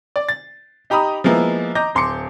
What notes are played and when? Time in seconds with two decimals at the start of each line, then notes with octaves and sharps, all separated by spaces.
0.16 D5
0.29 A6
0.90 D#4 G4 A#5 B5 D#6
1.24 F3 G#3 A#3 B3 E4
1.75 D#5 A#5 D6 G6 A#6
1.95 D1 C6 D6 C#7